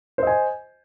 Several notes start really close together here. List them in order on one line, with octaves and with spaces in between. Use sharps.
C5 D#5 G#5